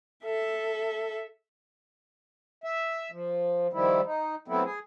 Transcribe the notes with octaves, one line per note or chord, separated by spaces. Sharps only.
A4 E5
E5
F3
D#3 F3 G3 E4
D#4
F#3 A3 B3 C4 E4
G#4